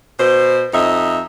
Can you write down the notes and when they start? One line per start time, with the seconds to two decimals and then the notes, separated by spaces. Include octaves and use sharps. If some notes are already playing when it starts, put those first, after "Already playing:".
0.19 B2 C5
0.73 F2 D#4 D#5 E5